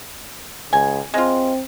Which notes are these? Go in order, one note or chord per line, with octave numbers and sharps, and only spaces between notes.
C#2 G#5
G#3 C4 F4